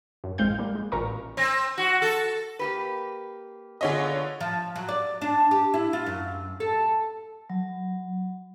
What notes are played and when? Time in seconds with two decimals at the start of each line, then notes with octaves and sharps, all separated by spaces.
0.24 F#2
0.38 A1 G#3 C4 F5 G6
0.59 G3 A#3
0.75 G#3
0.92 A1 A#2 A#4 A#5 C#6
1.37 C4
1.78 F#4
2.02 A4
2.59 A#3 G4 B4
3.81 D3 B3 F4 G#4 C#5 D#5
4.41 F3
4.76 F#3
4.89 D5
5.21 D4
5.51 G4
5.74 E4
5.93 F4
6.06 F#2
6.60 A4
7.50 F#3